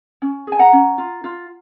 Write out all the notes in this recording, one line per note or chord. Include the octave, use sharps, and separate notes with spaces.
C#4
G#4 G#5
F#5 A#5
C#4
F4
F4